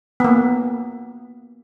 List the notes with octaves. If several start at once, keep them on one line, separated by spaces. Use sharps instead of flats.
A#3 B3